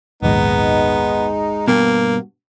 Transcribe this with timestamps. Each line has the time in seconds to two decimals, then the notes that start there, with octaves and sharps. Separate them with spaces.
0.23 A#1 D#2 G#2 G#3 B3 D#4
1.68 G2 B2 A#3